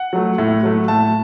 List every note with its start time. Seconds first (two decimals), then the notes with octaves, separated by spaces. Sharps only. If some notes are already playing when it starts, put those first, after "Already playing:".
Already playing: F#5
0.13 F#3 A3
0.38 A2
0.63 F#3 A3
0.88 A2 A5